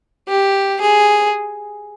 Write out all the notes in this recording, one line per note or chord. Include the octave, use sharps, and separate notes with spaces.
G4
G#4